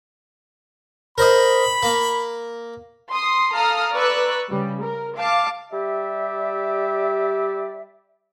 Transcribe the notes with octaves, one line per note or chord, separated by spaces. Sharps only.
A#4 C5 D#5 B5
A#3
C6 D#6
A4 F5 A#5 D#6 F6
B4 D5 A#5 C#6 E6 F#6
C#3 G3
A#4
F5 A5 D6
G3 G4 D5 E5